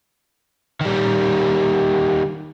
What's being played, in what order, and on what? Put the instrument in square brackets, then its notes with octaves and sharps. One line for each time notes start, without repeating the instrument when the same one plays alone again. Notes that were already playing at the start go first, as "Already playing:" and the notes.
[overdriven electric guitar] D#3 G3